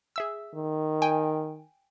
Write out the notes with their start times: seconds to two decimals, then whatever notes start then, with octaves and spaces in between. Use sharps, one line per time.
0.16 G#4 E5 E6
0.55 D#3
1.02 G5 G#5